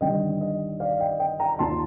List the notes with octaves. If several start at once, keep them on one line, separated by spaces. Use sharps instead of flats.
G1 G2 D#3 G3 D4 D#5 G5
D#5
D5 F5
D#5 G5
D#5 G5
G5 A#5
A#5
D#2 D#3 A#3 F4 A5 C6